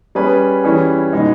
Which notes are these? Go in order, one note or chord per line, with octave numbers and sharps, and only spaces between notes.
G3 C#4 G#4 B4
E3 G3 C#4 E4 G#4
B2 G#3 D#4